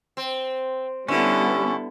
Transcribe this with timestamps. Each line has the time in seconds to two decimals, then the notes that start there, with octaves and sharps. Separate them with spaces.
0.17 C4
1.08 D3 G3 B3 C#4 E4 A4